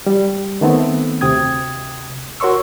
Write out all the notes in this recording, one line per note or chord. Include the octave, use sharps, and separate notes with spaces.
G3
D#3 A3 B3 C4
D2 C3 G5 D#6 G#6
F#4 A#4 C#5 C6 C#6 E6